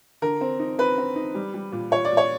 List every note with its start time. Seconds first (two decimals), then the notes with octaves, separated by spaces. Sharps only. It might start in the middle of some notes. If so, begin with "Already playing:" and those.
0.22 D3 A#4
0.41 C4
0.59 D#4
0.78 C4 B4
0.98 C4
1.16 D#4
1.34 G3
1.54 G3
1.72 A#2
1.91 A#2 C#5
2.05 D5
2.11 A#2
2.17 C#5